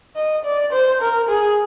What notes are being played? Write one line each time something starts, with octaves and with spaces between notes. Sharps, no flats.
D#5
D5
C5
A#4
G#4